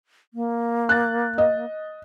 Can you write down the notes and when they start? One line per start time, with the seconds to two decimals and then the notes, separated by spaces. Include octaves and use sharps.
0.34 A#3
0.89 F#6 A6
1.38 D#5